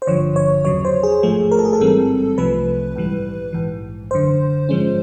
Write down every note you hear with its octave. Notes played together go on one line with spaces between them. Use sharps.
C5
G#1 G2 D3 F3 C#5
C#5
E2 C#3 F#3 C#5
C5
G#4
A1 G#2 F3 A3 G#4
A#4
A4
G#4
A4
A1 G#2 E3 G3 C4
C2 C3 F3 A3 B4
A#1 G#2 E3 G3
A#1 G#2 E3
G#1 F#2 D3 C5
G#2 F3 G#3 C#4